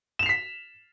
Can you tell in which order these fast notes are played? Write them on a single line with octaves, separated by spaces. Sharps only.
E7 F7 C7 B6